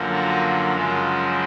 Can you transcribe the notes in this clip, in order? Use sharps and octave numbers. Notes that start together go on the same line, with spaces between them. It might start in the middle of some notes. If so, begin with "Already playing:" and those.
Already playing: F#2 D3 F3 A#3
F#4
F#2 C#3 F3 G#3